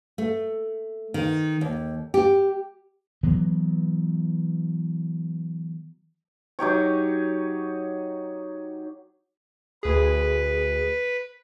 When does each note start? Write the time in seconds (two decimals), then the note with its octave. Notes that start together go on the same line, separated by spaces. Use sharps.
0.18 A3
1.14 D#3
1.61 D#2
2.14 G4
3.23 E3 F#3 B3
6.59 F#3 D#4 G4 C#5
9.83 D2 G#4 B4